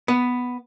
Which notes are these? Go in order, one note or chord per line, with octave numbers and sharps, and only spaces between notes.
B3